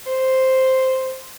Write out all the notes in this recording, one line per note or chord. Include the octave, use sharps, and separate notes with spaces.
C5